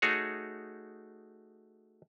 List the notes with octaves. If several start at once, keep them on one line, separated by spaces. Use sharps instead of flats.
A3 D#4 F#4 G#4 C#5